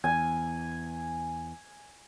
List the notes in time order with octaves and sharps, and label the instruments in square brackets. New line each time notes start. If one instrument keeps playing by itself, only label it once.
[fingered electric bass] E2 [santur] G#5